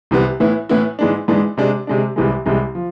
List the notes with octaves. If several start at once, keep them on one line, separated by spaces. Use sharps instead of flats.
C2 C3 E3 B3
A2 E3 B3 E4
A2 E3 B3 E4
G#2 E3 G#3 D4
G#2 E3 G#3 D4
C3 G#3 D4
C3 G#3 D4
C2 C3 E3 G#3
C2 C3 E3 G#3
F3